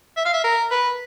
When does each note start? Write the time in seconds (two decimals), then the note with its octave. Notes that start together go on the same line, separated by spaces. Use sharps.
0.17 E5
0.26 F5
0.34 E5
0.44 A#4
0.71 B4